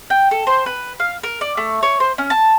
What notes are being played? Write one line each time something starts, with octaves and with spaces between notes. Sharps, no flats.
G5
A4
C5
B4
F5
A#4
D5
A3
C#5
C5
C#4
A5